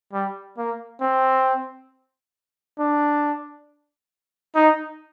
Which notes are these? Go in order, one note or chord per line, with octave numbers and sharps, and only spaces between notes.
G3
A#3
C4
D4
D#4